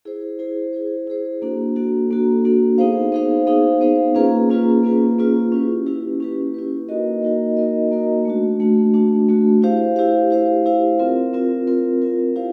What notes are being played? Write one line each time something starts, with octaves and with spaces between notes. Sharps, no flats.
E4 G#4 C5
E4 G#4 C5
E4 G#4 C5
E4 G#4 C5
A#3 D4 F#4 A4
A#3 D4 F#4 A4
A#3 D4 F#4 A4
A#3 D4 F#4 A4
B3 D#4 G#4 C5 F5
B3 D#4 G#4 C5 F5
B3 D#4 G#4 C5 F5
B3 D#4 G#4 C5 F5
A#3 C#4 F4 G#4 B4
A#3 C#4 F4 G#4 B4
A#3 C#4 F4 G#4 B4
A#3 C#4 F4 G#4 B4
C#4 E4 G4 B4
C#4 E4 G4 B4
C#4 E4 G4 B4
C#4 E4 G4 B4
A#3 D#4 F#4 A#4 D#5
A#3 D#4 F#4 A#4 D#5
A#3 D#4 F#4 A#4 D#5
A#3 D#4 F#4 A#4 D#5
A3 D4 F#4
A3 D4 F#4
A3 D4 F#4
A3 D4 F#4
E4 G4 C5 F5
E4 G4 C5 F5
E4 G4 C5 F5
E4 G4 C5 F5
C4 F4 A#4
C4 F4 A#4
C4 F4 A#4
C4 F4 A#4
E4 G4 C5 F5